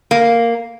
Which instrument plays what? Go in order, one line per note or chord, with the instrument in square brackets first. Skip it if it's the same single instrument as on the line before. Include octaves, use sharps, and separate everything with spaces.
[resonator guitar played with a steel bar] A#3